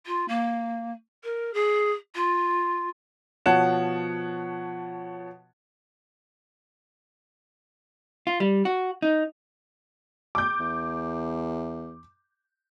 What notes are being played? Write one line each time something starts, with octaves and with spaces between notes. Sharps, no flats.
F4
A#3
A#4
G#4
F4
B2 F3 C#5 F#5 A5 E7
F4
G3
F#4
D#4
D6 G6
E2